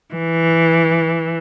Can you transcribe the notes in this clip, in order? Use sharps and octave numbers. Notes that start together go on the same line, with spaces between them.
E3